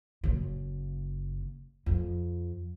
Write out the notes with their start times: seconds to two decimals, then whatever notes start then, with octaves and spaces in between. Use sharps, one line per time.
0.23 F#1 C#3
1.86 F2